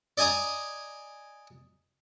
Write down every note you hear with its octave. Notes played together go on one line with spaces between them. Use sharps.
D5 D#5 G#5 A#5 D#6